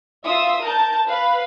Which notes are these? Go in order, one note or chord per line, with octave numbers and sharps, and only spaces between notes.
F4 E5 D#6 E6
A#4 A5 G6
B4 F5